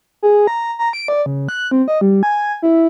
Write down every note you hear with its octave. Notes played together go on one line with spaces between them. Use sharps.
G#4
A#5
A#5
D7
D5
C#3
F#6
C4
D#5
G3
G#5
E4